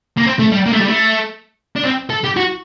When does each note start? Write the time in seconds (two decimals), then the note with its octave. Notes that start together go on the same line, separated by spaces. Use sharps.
0.17 A#3
0.27 C4
0.39 A3
0.52 G3
0.66 A#3
0.73 A3
0.81 G3
0.88 A3
1.76 D4
1.84 C4
2.10 A4
2.24 G4
2.37 F#4